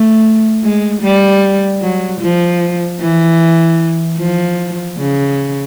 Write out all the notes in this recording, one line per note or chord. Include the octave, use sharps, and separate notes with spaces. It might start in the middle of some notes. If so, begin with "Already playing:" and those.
Already playing: A3
G#3
G3
F#3
F3
E3
F3
C#3